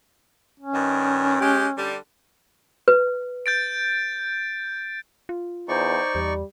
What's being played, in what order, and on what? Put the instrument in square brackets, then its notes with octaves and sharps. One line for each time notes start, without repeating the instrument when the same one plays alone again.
[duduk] C#4
[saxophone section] G2 D#3
G#3 G4
D3 G3
[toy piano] B4
[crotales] G6 A6 D7
[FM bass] F4
[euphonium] E2 [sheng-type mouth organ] D#4 D5 C#6 [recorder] C5
[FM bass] E2 [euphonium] G3